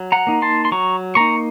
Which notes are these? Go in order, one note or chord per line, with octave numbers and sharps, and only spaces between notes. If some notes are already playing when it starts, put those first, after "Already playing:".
Already playing: F#3
F#5 A#5
A#3 D#4
A5 C6
C6
F#3 A#5 C#6
A#3 D#4 A#5 C#6